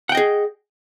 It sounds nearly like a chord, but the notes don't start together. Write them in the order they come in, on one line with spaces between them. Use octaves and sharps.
F#5 G5 D#5 G#4